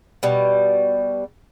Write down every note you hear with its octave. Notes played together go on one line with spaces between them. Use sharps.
B2 G3